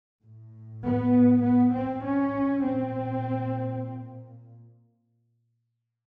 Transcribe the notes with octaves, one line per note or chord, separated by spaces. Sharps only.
A2
B3
B3
C4
C#4
A#2 C4